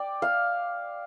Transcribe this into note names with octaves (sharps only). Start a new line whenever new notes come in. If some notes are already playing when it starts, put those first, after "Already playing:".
Already playing: D5 G5
F5